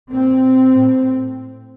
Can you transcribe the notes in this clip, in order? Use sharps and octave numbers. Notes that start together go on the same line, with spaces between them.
A#2 C4
A2